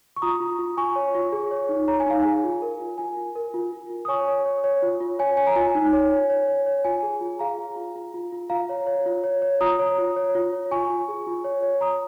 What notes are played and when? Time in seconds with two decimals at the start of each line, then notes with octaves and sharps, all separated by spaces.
0.16 C#6
0.22 F4 A#5 D#6
0.40 F4
0.59 F4
0.77 F4 G#5 C#6
0.96 C#5
1.15 F4
1.32 G#4
1.51 C#5
1.69 D#4
1.88 C#5 A#5
2.00 G#5
2.06 D#4 F5
2.22 G#4 G#5
2.44 F4
2.62 A#4
2.81 F4
2.98 F4 G#5
3.17 F4
3.36 A#4
3.54 F4
3.73 F4
3.90 F4
4.05 D#6
4.08 C#5 G#5 C#6
4.28 C#5
4.45 C#5
4.64 C#5
4.83 F4
5.00 F4
5.19 C#5 G#5
5.37 C#5 G#5
5.47 A#5
5.56 F4 G#5
5.75 D#4
5.93 C#5
6.12 C#5
6.30 C#5
6.48 C#5
6.66 C#5
6.84 F4 G#5
7.03 G#4
7.21 F4
7.39 G#4 F5 A#5
7.59 G#4
7.76 F4
7.96 F4
8.14 F4
8.32 F4
8.50 F4 F5 A#5
8.69 C#5
8.87 C#5
9.06 F4
9.24 C#5
9.42 C#5
9.61 F4 A#5 D#6
9.79 C#5
9.98 F4
10.16 C#5
10.35 F4
10.53 C#5
10.71 F4 G#5 C#6
10.90 F4
11.08 G#4
11.27 F4
11.44 C#5
11.62 C#5
11.81 C#5 A#5 D#6